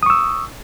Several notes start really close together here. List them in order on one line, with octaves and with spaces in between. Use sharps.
D#6 C#6 E6